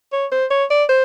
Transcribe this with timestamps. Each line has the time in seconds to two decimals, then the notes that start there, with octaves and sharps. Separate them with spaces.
0.13 C#5
0.32 C5
0.51 C#5
0.70 D5
0.89 C5